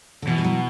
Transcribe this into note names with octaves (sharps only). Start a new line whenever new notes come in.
D3
B2 E3
G3
F#3